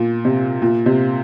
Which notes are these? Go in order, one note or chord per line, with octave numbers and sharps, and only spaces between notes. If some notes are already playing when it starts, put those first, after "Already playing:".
Already playing: A#2
C3
A#2
C3